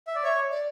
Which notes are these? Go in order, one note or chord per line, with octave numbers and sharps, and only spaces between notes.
E5
D5
C#5 E5
D5